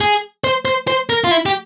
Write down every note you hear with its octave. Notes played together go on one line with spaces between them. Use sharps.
G#4
C5
C5
C5
A#4
F4
E4
G4